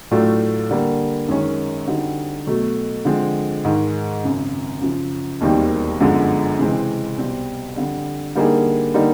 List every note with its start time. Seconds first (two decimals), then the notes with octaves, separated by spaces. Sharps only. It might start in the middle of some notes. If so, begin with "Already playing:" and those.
0.11 A2 F#3 A3 D4 F4
0.71 D3 G3 A#3
1.28 F#2 D#3 G#3 C#4
1.87 D3 G3 C4 D#4 F#4
2.47 B2 F#3 A3
3.05 D3 F3 G#3 C4
3.64 G#2 D#3 G#3
4.24 G#1 F#2 C#3
4.81 F#2 C#3 F3
5.41 E1 D#2 D#3 G3 C4
6.00 G1 F#2 D3 F3 G#3
6.58 C#2 C3 E3 G#3 C4
7.17 C2 B2 G3 C4
7.76 F2 D3 G3
8.35 D3 G3 A#3 D#4 G#4
8.94 D3 G3 A#3 D#4